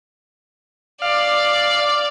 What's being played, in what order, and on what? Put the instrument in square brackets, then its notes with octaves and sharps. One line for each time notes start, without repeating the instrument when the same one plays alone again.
[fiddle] D5 [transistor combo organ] F5